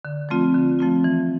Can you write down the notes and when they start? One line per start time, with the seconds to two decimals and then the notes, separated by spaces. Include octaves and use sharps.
0.05 D3
0.29 F3 A3 C4 F4
0.54 D3
0.79 F3 A3 C4 F4
1.04 E3